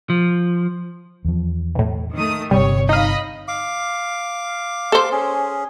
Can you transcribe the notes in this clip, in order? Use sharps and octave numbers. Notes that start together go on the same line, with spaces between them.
F3
E2 F3
B1 A2
D#3 A3 D#6
G1 G2 C3 G3 C#5
D#4 D#5 F5 B5
F5 D6
A4 C5
C#4 G#4